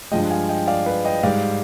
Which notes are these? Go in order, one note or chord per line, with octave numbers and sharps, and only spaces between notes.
G2 F3 G#3 D#5 G5
F5 G#5
D#5 G5
D5 F5
B4 D5
D#5 G5
G#2 G3 D5 F5